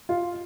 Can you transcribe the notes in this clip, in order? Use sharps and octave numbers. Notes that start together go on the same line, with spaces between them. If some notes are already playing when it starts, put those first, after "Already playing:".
F4